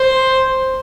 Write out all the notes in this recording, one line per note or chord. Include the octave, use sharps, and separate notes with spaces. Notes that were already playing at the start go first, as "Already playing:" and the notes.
Already playing: C5